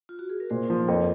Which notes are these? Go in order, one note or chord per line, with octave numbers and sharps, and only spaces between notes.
F4
F#4
G#4
A#4
A#2 G#4 C5
F3
F2 A#4 C#5